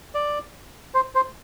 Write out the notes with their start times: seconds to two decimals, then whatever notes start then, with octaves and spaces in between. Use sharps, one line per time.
0.15 D5
0.94 C5
1.15 C5